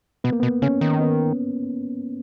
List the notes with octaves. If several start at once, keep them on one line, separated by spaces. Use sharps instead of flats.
B2 B3
A#3
B2 B3
C#3 C#4
D#3
B3